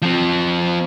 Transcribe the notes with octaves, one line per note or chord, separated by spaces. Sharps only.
F3 C4